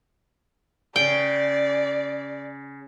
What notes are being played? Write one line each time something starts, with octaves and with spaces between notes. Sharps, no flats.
C#3 G#4 D5 G5